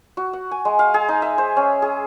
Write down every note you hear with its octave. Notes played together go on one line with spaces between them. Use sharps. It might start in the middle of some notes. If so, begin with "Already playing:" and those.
F#4
F#5
G#5
G#3
F5
G#4
D#4
E5
C5
C#4
G#4